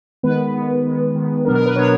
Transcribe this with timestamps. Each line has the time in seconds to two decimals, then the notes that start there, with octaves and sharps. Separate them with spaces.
0.23 D#3 G#3 B3 B4
0.54 D#3 G#3 B3
0.84 D#3 G#3 B3
1.15 D#3 G#3 B3
1.45 B2 F#3 B3 D4 A#4
1.55 A#4
1.66 B4
1.75 B2 F#3 B3 D4 C#5